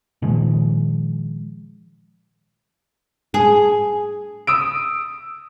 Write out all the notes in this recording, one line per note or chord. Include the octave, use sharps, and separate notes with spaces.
A#2 D#3 F3 G#3
G#4
D#6 E6 D7